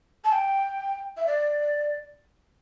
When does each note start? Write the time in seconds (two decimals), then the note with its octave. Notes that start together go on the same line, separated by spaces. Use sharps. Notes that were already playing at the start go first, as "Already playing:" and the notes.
0.24 A5
0.32 G5
1.17 E5
1.27 D5